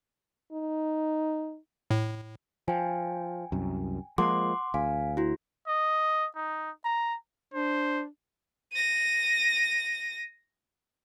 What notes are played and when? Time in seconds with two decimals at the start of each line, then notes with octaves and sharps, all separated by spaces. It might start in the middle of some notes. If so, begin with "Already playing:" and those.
0.53 D#4
1.91 A2
2.68 F3 G5 G#5
3.52 C2 F#2
4.18 F3 G#3 A#3 F#5 C6 D6
4.74 D2 F5 G#5
5.17 E4 F#4
5.67 D#5
6.36 D#4
6.85 A#5
7.54 D4 C5
8.73 A#6 D#7